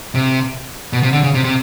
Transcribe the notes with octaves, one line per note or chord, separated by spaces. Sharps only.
C3
B2
C3
D3
C#3
C3
C3